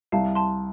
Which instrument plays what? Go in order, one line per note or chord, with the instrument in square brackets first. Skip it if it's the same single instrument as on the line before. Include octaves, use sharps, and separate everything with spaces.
[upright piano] C2 [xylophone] F5 A5
[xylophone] A5 C6